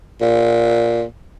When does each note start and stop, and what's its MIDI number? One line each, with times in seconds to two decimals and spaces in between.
0.21 1.04 46